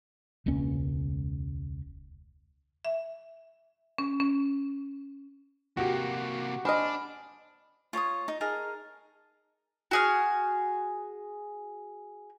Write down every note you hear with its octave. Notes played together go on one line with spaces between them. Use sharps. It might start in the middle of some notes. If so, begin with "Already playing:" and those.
E1 C#2 A#3 C#4
E5
C#4
C#4
C3 A#3 F#4 G4
D4 C5 D#5 G#5 B5 F6
F4 C#5 A#5 D#6
D#4
D#4 G#4 A#4 A5
F#4 G#4 F6